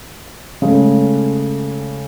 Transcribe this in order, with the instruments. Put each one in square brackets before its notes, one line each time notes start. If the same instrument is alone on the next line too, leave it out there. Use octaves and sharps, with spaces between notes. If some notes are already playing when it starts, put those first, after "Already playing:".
[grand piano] C#3 G#3 A3